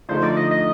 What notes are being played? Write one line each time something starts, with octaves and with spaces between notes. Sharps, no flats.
D3 F3 A3 D#4 C5
D5
D#5
D#5